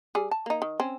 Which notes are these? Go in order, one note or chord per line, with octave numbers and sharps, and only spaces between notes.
G3 G#4
A5
A#3 D#4
D#3
C4 C#4